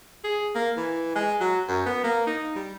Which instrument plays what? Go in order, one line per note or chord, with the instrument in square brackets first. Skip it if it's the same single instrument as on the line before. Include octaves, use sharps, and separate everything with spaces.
[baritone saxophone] G#4
A#3
E3
G#3
F#3
F#2
B3
A#3
D#4
G3